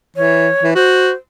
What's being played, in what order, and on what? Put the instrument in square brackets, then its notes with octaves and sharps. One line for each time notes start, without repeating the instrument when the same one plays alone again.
[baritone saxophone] E3 [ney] C#5
[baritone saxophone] E3
[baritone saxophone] F#4 [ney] C5